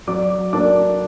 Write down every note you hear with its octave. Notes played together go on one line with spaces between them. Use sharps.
F#3 D5 D6
A#3 D4 D5 D6